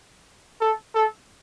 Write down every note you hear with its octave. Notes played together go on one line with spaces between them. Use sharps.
A4
A4